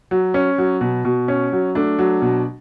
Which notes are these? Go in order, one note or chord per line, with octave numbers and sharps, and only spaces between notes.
F#3
C#4
F#3
B2
B2
C#4
F#3
A3 D4
F#3
B2